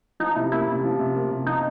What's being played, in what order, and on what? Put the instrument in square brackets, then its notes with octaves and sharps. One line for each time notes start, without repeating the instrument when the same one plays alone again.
[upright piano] F3 [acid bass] D#4
[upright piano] C3 [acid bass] E4
[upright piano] A#3 [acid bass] E4
[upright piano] C3
F3
C3
A#3
C3
[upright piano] F3 [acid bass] D#4